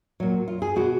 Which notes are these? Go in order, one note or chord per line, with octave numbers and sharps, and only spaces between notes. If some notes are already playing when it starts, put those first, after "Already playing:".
A#2 F#3 C#5
F4
G#4
B2 G#3 F#4